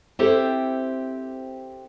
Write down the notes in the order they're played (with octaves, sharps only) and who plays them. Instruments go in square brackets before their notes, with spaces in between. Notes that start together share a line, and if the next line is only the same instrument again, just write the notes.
[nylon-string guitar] C4 E4 G4 A4 C5